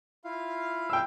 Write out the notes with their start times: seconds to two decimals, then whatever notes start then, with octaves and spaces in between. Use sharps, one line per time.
0.24 E4 F4 F5
0.90 G5 E6